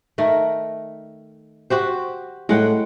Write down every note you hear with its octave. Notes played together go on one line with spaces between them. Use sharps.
D#3 A3 A#4
F#4 G4 C5
A2 G#3 F#5 G5